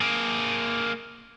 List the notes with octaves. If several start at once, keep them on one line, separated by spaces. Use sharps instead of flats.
A#3 G#4